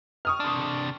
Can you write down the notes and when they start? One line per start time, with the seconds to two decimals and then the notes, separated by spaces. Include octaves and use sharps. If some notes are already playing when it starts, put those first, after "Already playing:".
0.25 C#6 D#6 F6
0.40 C3 D4